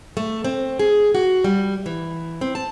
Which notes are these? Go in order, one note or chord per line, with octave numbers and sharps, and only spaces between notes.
A3
C4
G#4
F#4
G3
E3
C4
A5